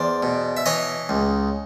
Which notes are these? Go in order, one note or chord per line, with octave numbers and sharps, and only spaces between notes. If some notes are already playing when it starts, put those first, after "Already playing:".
Already playing: E2 C5 D5
B2
E5
E3 C#5 D#5
C#2